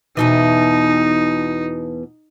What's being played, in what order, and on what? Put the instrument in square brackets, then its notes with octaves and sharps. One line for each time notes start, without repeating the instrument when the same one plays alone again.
[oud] E2 B2 E3 [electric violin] D#4